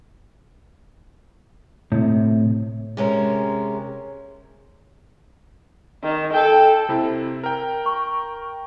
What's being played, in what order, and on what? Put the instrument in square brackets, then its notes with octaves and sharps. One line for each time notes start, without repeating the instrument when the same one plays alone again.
[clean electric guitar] A2 C3
[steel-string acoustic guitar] C3 G#3 C#4 A#4
[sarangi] D#3
[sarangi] A4 [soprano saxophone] G5
[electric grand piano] C3 C4 E4
A#4 G5
[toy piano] C#6